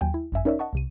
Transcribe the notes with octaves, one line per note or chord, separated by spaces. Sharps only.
D#2 F#3 G5 G#5
E4
G#1 F#2 E5 G#5
C#4 D#4 A#4 C#5 D5 E5
D#5 F#5 A5 C#6
C2 C3 D#7